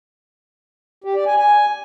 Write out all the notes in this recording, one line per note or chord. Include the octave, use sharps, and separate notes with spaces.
G4
D5
G#5
G#5